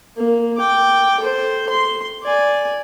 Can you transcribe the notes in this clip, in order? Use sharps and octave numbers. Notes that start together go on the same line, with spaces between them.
A#3
G5 D6
A4 C5
C6
D5 G#5